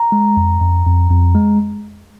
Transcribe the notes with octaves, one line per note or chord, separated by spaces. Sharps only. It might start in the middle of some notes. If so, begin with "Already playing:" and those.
Already playing: A#5
G#3
F2
F2
F2
F2
G#3